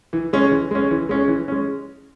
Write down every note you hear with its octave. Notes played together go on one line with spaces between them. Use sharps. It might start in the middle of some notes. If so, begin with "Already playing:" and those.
E3
G#3 C#4
E3
G#3 C#4
E3
G#3 C#4
E3
G#3 C#4